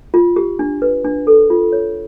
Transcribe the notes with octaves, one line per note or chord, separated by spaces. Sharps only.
F4
G4
D4
B4
D4
A4
F4
C#5